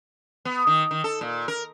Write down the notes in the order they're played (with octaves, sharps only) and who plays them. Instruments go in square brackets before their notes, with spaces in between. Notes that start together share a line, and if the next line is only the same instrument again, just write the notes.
[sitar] B3
D#3
D#3
A4
A#2
A#4